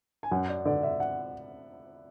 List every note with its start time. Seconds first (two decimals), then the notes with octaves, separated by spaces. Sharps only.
0.23 G#5
0.32 F#2 F#5
0.49 D5
0.65 D3 D5
0.83 E5
1.00 F#5